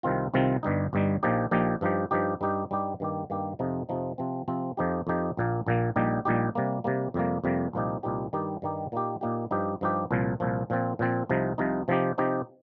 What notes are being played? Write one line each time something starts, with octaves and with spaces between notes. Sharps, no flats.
C2 C3 D#3 C4 F4
C2 C3 D#3 C4 F4
G1 G2 G3 D#4
G1 G2 G3 D#4
A#1 A#2 F3 D#4 G4
A#1 A#2 F3 D#4 G4
G2 F3 D#4 G4
G2 F3 D#4 G4
G2 G3 D#4 G4
G2 G3 D#4 G4
G2 D#3 A#3 G4
G2 D#3 A#3 G4
F2 C3 F3 D#4
F2 C3 F3 D#4
C3 F3 C4
C3 F3 C4
F2 F3 D#4 G4
F2 F3 D#4 G4
A#1 A#2 A#3
A#1 A#2 A#3
A#1 A#2 G3 D#4 G4
A#1 A#2 G3 D#4 G4
C3 G3 A#3
C3 G3 A#3
F2 C3 G3 A#3
F2 C3 G3 A#3
C2 A#2 F3 D#4 G4
C2 A#2 F3 D#4 G4
G2 D#3 G3 D#4 G4
G2 D#3 G3 D#4 G4
A#2 A#3 D#4 G4
A#2 A#3 D#4 G4
G2 F3 D#4 G4
G2 F3 D#4 G4
C2 A#2 F3
C2 A#2 F3
A#2 F3 C4
A#2 F3 C4
C2 C3 F3 D#4
C2 C3 F3 D#4
C3 F3 C4 D#4 G4
C3 F3 C4 D#4 G4